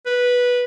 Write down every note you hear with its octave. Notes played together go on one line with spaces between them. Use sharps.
B4